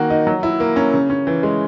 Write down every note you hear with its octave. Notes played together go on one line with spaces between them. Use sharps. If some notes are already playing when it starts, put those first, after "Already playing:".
Already playing: D#3 A#3 F#4
D#4
F#3
E4
A#3
C#4
C#3
C#4
E3
G#3